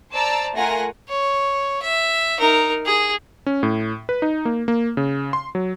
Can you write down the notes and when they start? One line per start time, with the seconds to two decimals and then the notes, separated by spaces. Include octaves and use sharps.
0.12 C5 D5 A5 A#5 E6 A6
0.56 A3 F4 A#4 F#5 G#5 A#6
1.09 C#5
1.82 E5
2.39 D#4 A#4
2.86 G#4
3.46 C#4
3.63 A2
4.09 B4
4.22 D#4
4.45 A#3
4.68 A#3
4.97 C#3
5.33 C6
5.55 F#3